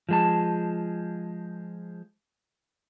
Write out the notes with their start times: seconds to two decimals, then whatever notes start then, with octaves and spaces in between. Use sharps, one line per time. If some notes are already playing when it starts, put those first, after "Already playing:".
0.09 F3 G#3 A5